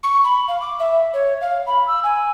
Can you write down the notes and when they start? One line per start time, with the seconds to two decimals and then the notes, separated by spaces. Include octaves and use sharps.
0.03 C#6
0.24 B5
0.48 F5
0.60 D6
0.79 E5
1.13 C#5
1.41 F5
1.66 B5
1.87 E6
2.03 G#5